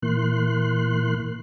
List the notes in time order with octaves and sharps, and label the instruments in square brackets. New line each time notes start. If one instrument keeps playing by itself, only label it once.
[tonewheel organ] A#2 E3 A#3 C6 F#6